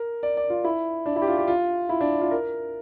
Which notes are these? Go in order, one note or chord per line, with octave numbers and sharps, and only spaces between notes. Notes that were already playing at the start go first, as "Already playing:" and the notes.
Already playing: A#4
D5
D5
F4
E4
D4
E4
G4
F4
G4
F4
E4
D4
F4
A#4